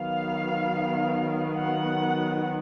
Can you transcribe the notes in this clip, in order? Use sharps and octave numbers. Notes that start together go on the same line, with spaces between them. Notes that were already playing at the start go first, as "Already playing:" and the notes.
Already playing: D#3 F#3 B3 F5
F#5